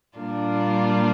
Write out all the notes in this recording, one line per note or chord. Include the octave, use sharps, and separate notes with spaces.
A#2 G3 A#3 D4 F4